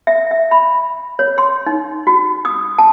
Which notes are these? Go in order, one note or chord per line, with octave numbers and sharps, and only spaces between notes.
E5
E5
B5
C#5
C6
D#4
F#4
D#6
A5